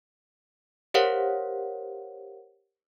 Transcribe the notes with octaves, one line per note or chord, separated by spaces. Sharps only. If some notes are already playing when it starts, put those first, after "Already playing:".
G4 A#4 C5 C#5 F5 F#5